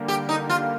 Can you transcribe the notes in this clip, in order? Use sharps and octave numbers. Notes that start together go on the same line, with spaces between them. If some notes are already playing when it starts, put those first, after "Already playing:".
Already playing: D3 G3 A#3
G4
D#4
F4